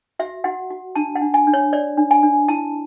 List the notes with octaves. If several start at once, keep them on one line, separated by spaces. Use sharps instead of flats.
F#4 E5
F#4 F#5
F#4
D4 A5
F#5
D4
G#5
D4
C#5
C#5 D5
D4
G#5
D4
E4 A5